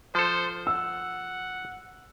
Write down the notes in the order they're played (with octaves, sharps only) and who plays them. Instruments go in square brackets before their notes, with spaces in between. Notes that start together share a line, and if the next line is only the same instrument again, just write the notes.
[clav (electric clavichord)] F3 A4 [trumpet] C5
[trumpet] F#5 [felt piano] E6